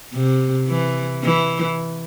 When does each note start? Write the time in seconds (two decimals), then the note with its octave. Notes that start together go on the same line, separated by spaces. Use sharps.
0.13 C3
0.68 E3
1.24 E3